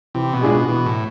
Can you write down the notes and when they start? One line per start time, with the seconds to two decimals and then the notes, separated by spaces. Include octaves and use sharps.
0.15 C3 E3
0.33 B2
0.41 A2 G#3 D4 F4 G#4
0.50 B2
0.68 B2 E3
0.86 A2